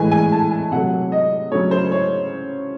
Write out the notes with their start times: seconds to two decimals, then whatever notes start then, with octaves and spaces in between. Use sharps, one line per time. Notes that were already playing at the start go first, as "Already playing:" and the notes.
Already playing: A2 E3 G#3 G#5
0.11 G#5
0.32 A5
0.51 G#5
0.72 C3 F#3 A3 F#5
1.12 D#5
1.52 C#3 F#3 A3 C#5
1.71 C5
1.92 C#5